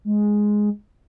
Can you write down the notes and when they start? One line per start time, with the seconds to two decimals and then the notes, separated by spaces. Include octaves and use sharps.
0.05 G#3